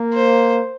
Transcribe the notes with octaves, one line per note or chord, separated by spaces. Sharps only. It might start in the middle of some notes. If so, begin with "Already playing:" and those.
Already playing: A#3
C5